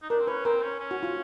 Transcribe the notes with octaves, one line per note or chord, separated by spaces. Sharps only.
D#4
D4 A#4
C4
C#4 B4
C4 A#4
C#4
C#4
F#4
F4